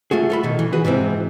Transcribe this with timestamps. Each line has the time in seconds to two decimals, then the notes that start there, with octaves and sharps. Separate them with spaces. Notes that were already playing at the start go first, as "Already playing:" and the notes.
0.11 A3 F4 F#4 G#4
0.30 F4 A4 B5
0.43 B2 D#3
0.59 E3
0.73 F#4 G#4 B4
0.84 G#2 C3 E3 C4